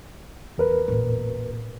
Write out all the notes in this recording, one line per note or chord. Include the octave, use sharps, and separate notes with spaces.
E2 A#4 B4
A1 A#2